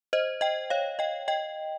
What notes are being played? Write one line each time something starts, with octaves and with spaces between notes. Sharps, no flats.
C5 D#5
D#5 G5
C#5 F5
D#5 G5
D#5 G5